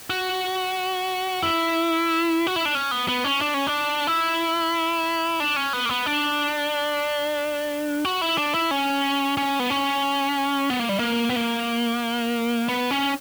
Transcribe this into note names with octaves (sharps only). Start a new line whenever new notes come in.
F#4
E4
F#4
E4
D4
C#4
B3
B3
C#4
D4
C#4
D4
E4
D4
C#4
B3
A#3
B3
D4
F#4
E4
D4
E4
C#4
C#4
B3
C#4
B3
A#3
G3
A#3
B3
A#3
B3
C#4